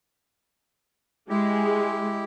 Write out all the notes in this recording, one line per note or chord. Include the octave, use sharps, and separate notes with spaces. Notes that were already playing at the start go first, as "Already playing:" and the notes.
G#3 E4 G4